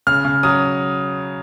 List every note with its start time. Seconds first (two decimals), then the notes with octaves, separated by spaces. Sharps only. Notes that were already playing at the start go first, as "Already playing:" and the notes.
0.07 C#3 F6
0.25 C#3
0.43 F#3 D#6